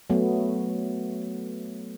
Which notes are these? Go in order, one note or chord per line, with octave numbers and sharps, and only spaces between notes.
F#3 A3 B3